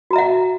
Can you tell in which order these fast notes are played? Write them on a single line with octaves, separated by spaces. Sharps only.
F#4 A#5 E5 F#5